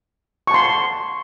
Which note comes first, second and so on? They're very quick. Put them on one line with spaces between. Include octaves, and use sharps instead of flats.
C#6 A5 C6